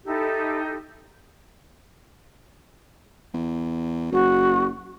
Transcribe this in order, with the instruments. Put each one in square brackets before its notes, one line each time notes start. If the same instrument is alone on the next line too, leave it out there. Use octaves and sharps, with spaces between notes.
[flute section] D#4 E4 G4 A4
[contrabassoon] E2
[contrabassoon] F#1 [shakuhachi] F#4